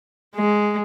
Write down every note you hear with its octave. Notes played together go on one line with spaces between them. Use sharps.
G#3